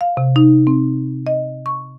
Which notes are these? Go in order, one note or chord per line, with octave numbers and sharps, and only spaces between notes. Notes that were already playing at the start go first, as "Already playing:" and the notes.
F5
C3
D#4
C4
D#5
C#6